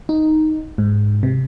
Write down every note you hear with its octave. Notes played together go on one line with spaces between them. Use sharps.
D#4
G#2
C3